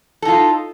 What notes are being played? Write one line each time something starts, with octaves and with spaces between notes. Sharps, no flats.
D#4 F4 A4